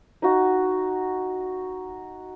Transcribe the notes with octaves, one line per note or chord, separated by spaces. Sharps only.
D#4 F#4